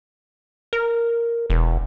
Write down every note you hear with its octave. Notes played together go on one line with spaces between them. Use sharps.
A#4
E1